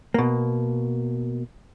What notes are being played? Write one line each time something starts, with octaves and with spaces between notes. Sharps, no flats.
B2 A#3